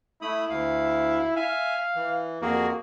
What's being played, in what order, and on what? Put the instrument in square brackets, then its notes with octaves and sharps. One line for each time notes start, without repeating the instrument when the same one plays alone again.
[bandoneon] A3 B5 D#6 [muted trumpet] E4
[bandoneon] D2 F5
[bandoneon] E5 G#5 [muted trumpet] F5
[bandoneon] E3
[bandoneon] F2 F#4 G#4 [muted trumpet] A#3